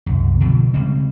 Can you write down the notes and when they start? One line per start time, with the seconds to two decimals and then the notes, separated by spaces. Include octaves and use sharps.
0.06 C2 F#2
0.40 B2 D3 F3
0.74 C#3 G3 G#3 C4